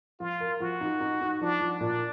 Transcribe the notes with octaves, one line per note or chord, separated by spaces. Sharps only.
F3 F4
A#4
F3 F#4
D#4
D#4
D#4
F3 D4
F3
A#2 D4